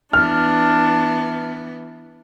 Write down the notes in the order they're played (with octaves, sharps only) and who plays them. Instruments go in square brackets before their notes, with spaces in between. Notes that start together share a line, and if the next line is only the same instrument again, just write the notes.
[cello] E3 B3 [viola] D4 [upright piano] F6